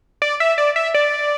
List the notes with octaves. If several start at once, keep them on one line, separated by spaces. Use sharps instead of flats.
D5
E5
D5
E5
D5